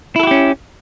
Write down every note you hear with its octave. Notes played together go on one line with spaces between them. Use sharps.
C#4 E4 F#4 G4 A4